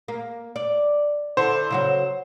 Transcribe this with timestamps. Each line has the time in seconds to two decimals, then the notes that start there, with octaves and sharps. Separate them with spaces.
0.08 A#3
0.56 D5
1.37 D3 E4 A4 C5
1.70 C#3 F#3 F#4